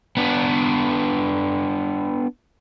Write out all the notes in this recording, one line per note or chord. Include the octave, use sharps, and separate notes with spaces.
B3 D4